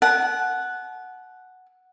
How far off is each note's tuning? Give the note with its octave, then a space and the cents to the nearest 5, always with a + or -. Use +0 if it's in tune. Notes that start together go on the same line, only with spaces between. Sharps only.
F#5 +0 A5 -35